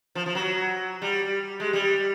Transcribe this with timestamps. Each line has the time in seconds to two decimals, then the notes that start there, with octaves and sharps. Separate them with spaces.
0.15 F3
0.26 F3
0.35 F#3
1.02 G3
1.60 G#3
1.73 G3